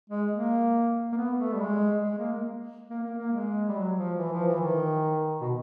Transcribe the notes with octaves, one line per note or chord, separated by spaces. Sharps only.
G#3
A#3
A#3
B3
A3
G3
G#3
G#3
A#3
A#3
A#3
A#3
A#3
G#3
G3
F#3
F3
E3
F3
E3
D#3
B2